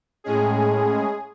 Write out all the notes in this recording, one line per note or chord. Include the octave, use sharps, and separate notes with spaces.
A2 G#3 C#4 G#4